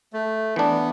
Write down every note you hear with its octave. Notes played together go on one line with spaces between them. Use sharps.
A3
E3 B3 D4